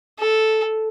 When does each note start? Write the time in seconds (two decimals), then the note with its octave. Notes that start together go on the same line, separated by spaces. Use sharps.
0.19 A4